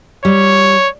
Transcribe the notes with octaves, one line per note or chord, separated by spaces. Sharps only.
G3 C#5